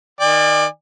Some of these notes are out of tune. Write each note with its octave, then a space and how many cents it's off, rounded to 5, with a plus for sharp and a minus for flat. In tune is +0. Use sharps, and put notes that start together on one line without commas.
D#3 +0 D5 +25 G#5 -35